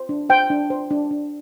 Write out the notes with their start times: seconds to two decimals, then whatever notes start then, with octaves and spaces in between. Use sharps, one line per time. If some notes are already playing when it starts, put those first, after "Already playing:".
Already playing: C5
0.09 D4
0.29 C5 G5
0.50 D4
0.70 C5
0.91 D4
1.11 D4